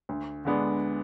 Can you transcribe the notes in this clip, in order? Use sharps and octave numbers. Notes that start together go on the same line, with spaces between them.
D2
D3 G#3 B3 D4